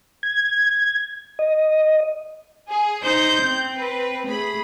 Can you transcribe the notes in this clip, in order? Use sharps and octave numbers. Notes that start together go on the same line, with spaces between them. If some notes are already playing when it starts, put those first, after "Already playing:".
G#6
D#5
G#4
D#4 C5 G6
C4
B4
A3 G#4 B5